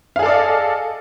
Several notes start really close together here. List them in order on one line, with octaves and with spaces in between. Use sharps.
F5 G#4 A4 D5 D#5